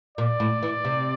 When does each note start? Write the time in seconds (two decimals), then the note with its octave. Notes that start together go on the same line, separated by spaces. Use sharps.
0.18 A#2 D5
0.40 A2
0.63 E3
0.85 C3